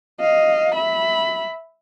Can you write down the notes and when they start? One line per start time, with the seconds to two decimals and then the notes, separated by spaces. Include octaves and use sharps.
0.20 D#5 F5
0.75 E5 B5